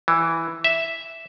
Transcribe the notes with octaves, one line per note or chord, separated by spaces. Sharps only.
E3
E5